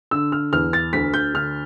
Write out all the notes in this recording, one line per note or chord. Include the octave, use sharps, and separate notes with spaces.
D3 E6
F6
E2 F6
A6
D2 B6
G6
D3 F6